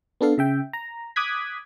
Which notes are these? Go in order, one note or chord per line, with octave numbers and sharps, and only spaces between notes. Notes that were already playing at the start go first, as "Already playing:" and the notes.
B3 D4 A4 F5
C#3 E5 G5
A#5
D6 D#6 F#6 G#6 B6